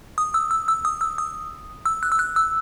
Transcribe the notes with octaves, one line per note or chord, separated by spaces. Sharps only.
D#6
E6
E6
E6
D#6
E6
D#6
E6
F#6
E6
F#6
E6